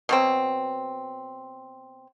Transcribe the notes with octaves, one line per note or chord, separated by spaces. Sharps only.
B2 F#3 C4